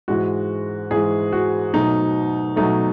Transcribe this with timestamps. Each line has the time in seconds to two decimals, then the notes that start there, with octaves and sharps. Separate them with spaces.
0.08 G#2 E3 G#3 F#4
0.91 G#2 E3 G#3 G#4
1.33 F#4
1.74 B2 F#3 A3 D#4
2.56 B2 F#3 A3 D#4